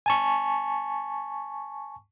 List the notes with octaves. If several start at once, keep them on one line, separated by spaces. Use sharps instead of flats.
G#5 A5 C#6